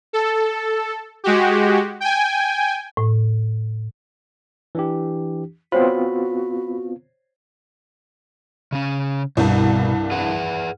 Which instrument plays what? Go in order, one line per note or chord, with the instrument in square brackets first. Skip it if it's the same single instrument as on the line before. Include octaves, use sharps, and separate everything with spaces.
[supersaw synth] A4
G#3 F#4 G4
G5 G#5
[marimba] A2
[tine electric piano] E3 D4 G4
[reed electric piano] B3 C4 F4 [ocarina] F#4 [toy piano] C5 C#5 F#5 [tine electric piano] B5
[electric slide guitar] C#3 C#4
[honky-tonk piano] C2 G2 [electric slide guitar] B2
[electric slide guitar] G#4 B4 F#5